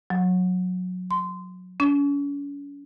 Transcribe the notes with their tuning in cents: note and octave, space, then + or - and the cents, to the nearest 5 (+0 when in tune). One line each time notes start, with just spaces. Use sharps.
F#3 -20
C6 -20
C#4 +40